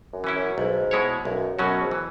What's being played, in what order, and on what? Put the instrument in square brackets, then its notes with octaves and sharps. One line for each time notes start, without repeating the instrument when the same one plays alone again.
[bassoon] F#2
[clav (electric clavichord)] E3 C#4 E4
[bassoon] F#2
[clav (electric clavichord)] B1 [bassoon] G#2
[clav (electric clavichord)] B2 G#3 E4 C#5
[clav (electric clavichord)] B1 [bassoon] F#2
[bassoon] F#2 [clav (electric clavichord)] B2 F#3 C#4 F#4
[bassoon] G#2
[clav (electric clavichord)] E3